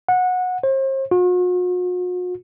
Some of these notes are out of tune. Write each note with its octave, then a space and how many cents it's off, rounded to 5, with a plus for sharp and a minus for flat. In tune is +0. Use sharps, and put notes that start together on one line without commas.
F#5 -20
C5 +40
F#4 -45